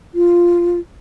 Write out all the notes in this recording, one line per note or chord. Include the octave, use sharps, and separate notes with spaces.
F4